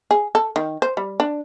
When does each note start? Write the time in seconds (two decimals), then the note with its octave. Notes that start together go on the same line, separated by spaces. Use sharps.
0.11 G#4
0.35 A4
0.56 D#3
0.82 C5
0.97 G3
1.20 D4